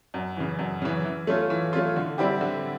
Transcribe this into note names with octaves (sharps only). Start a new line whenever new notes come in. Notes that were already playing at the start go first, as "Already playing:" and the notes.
F#2
C#3 E3
F#2
C#3 E3
E3
A3 C#4 F4
E3
A3 C#4 F4
D3
G3 C4 E4 G4
D3